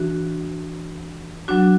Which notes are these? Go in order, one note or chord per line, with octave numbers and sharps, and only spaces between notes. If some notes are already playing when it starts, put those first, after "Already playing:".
Already playing: E3 D4 F#4
F#3 D4 F#4